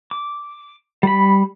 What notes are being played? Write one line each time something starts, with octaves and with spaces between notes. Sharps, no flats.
D6
G3 B5